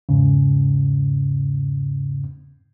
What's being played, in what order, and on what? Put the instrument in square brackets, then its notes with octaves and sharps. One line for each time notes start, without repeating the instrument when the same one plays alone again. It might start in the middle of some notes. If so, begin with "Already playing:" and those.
[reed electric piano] E2 G#2 C#3